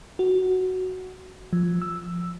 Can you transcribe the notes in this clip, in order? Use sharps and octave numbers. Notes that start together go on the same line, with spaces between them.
F#4
F3
E6